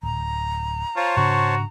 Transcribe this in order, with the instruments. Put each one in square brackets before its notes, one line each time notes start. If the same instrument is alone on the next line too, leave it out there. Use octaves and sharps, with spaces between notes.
[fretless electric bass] D1 [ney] A#5
[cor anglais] F4 [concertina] C5 C#5 A5
[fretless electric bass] G#2 C#3 D4 [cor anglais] F#4